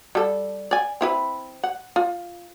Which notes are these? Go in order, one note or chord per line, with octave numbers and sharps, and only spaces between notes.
G3 A4
D5 G#5
C4 E4 B4
F#5
F4